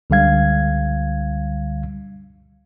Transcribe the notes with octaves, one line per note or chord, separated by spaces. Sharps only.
C#2 D3 G3 F5 G#6